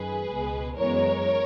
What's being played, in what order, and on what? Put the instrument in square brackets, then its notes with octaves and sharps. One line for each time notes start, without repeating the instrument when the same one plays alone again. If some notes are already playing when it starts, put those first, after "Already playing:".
Already playing: [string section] F#2 D#3 G#3 G#4 B4
C#2 B2 G#3
F#2 E3 G#3 B3 A#4 C#5